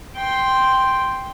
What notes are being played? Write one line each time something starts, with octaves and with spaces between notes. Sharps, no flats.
G5 C6